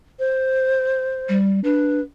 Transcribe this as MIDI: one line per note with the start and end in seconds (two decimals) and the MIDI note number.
0.19 1.38 72
1.29 1.60 55
1.64 2.00 62
1.64 2.01 71